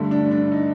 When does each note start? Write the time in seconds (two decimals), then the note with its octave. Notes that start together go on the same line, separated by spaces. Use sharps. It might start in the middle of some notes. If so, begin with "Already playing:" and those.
Already playing: G2 D3 A3
0.11 D4
0.31 D4
0.52 D#4